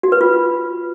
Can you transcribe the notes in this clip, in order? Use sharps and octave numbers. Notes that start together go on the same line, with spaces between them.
F#4
B4
F4